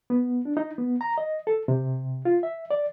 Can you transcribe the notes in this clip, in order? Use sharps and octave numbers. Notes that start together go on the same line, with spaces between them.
B3
D4
D#4
B3
A#5
D#5
A4
C3
F4
E5
D5